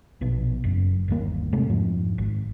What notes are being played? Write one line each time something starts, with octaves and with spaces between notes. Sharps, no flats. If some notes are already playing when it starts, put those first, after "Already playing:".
A#1 B2
F#1 F#2
G1 D#2 A#3
C3 G#3 A3
F2 G#2 F3
G#1